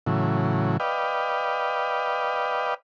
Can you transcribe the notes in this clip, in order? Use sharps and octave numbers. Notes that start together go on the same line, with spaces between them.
A2 C#3 E3 F#3
B4 D5 D#5 F5 G5